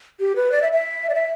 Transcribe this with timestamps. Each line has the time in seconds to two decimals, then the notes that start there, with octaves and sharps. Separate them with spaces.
0.20 G4
0.36 B4
0.52 D5
0.62 E5
0.72 E5
1.09 D5
1.15 E5